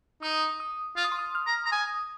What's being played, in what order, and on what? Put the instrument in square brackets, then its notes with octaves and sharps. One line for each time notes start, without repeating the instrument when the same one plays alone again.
[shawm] D#4 [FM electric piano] D#6
[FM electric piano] D#6
[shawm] F4 [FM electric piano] F6
[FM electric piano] D#6
C6
D#6
F6
[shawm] A#5
A#5
[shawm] G#5 [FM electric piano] D#6